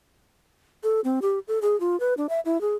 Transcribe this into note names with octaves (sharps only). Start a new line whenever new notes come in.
A4
C4
G4
A4
G#4
F4
B4
D4
E5
E4
G#4